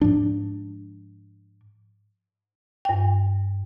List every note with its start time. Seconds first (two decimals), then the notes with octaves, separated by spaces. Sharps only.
0.01 G#2 F3 D4
2.85 G2 G5